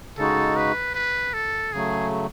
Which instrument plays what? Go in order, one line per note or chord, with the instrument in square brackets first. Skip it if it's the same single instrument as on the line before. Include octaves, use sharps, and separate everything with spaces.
[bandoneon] C#3 G#3 D#4 F#4 [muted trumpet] A4
[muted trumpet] B4
B4
A4
[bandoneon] C#3 F#3 A3 [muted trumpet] G#4